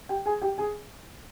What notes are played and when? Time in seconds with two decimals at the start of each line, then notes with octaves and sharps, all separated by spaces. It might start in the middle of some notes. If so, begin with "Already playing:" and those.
0.09 G4 G5
0.26 G#4 G#5
0.42 G4 G5
0.58 G#4 G#5